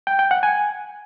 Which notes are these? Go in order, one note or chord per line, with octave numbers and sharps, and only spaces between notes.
G5
G5
F#5
G#5